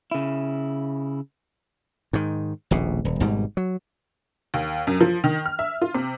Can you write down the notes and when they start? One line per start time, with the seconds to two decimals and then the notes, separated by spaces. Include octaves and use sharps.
0.11 C#3 E4
2.13 G#2 D#3
2.71 D#1 A#1 B2
3.05 D#1
3.20 G#1 G#2 B2 G3
3.57 F#3
4.54 D#2
4.87 F#2
5.01 F3
5.24 D#3
5.46 F6
5.59 E5
5.82 F4
5.95 C3